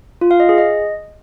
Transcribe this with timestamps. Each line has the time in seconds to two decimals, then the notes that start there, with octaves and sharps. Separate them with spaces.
0.21 F4
0.31 F5
0.40 D#5
0.49 G#4
0.58 D#5